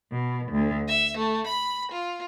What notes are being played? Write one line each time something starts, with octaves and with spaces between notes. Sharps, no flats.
B2
D2
E5
A3
B5
F4